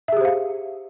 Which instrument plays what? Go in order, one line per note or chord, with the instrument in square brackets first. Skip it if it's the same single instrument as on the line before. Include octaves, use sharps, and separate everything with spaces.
[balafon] E5
G#4
G4
C5
F5